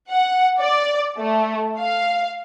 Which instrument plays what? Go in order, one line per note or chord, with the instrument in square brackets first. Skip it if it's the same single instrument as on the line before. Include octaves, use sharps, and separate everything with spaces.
[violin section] F#5
D5
A3
F5